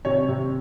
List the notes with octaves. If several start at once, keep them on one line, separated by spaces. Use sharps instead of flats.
C3 C#5
C3